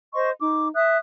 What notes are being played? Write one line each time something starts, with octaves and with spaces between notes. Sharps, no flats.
C5 D#5 C6 C#6
D#4 D6
E5 D#6 F#6